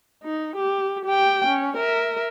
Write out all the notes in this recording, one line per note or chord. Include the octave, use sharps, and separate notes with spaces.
D#4
G4
G4 G5
C#4
A#4 E5